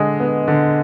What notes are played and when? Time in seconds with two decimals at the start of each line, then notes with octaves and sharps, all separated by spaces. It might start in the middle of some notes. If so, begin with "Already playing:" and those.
Already playing: D3 G#3
0.20 B3
0.48 D3